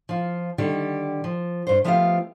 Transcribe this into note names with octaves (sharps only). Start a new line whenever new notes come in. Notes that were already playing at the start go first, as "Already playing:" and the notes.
F3 F4
D3 D#3 G3 G4
F3
G2 C5
F3 A3 B3 F4 G4 F5